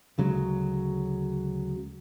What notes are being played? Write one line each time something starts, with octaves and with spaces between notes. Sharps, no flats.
D2 C#3 F#3 G#3